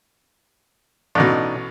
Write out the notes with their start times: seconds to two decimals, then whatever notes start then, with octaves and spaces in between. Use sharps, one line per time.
1.15 A1 B2 D4 D#4